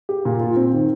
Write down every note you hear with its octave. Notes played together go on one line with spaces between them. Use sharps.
G4
A#2
F4
C4
D#3